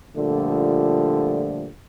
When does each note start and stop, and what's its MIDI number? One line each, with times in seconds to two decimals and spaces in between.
0.16 1.67 46
0.16 1.67 50
0.16 1.67 53
0.16 1.67 55
0.16 1.67 57